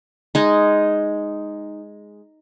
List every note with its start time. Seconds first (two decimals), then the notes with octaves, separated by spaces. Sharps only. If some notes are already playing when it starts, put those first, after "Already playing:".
0.35 G#3 D#4